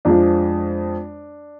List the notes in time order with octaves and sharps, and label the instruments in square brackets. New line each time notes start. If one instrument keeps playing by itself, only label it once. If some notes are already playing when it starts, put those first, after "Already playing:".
[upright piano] F2 F3 G#3 D4